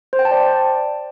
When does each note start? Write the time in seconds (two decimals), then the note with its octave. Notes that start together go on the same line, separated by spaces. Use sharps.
0.13 C5
0.19 G5
0.25 A5
0.31 D5